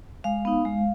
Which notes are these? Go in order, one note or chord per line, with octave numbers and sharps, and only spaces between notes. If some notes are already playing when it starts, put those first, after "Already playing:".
G#3 F5
B3 D#4
G#3